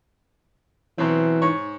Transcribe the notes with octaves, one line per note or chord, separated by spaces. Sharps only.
B2 E3 F#3 C4
G#2 C#5